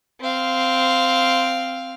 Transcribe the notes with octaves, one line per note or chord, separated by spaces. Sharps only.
C4 F5